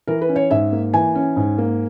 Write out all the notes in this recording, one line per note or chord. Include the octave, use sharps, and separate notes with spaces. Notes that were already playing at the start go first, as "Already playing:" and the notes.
E3 A#4
B4
C#4
C#5
G#2 E5
A#3
E3 G#5
C#4
G#2
A#3